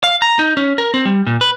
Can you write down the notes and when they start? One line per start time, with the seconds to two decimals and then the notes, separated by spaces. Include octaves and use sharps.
0.04 F5
0.22 A#5
0.39 D#4
0.57 C#4
0.78 A#4
0.94 C4
1.05 G3
1.27 A#2
1.41 B4